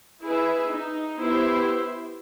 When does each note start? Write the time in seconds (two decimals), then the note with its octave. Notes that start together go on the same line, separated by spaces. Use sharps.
0.24 E4 G#4 B4 E5
0.70 D#4
1.20 B3 E4 G4 C5